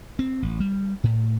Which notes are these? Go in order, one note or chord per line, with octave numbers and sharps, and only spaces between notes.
C4
A1
G3
A2